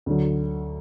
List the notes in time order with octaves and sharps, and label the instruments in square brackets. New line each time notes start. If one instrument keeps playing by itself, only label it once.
[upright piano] D2 D3 F#3